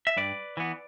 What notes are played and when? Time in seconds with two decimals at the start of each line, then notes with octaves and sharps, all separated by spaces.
0.07 E5
0.17 G2 B4 D5
0.57 E3 B3